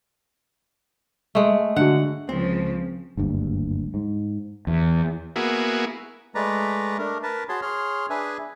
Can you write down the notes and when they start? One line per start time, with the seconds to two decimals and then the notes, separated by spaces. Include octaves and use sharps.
1.35 G#3 A3
1.76 D3 F#4 F#5
2.29 C#2 C#3 F3 C4
3.17 F#1 D2 G2
3.94 G#2
4.67 E2
5.36 A#3 B3 E4 F#4 G#4
6.35 G#3 A3 B4 D5 A#5
6.98 A3 D4 A#4
7.23 A#4 B4 A5
7.49 F#4 G#4 C#5 A5 C6
7.62 G#4 C#5 C6 F6
8.10 D4 G#4 B4 E5 G#5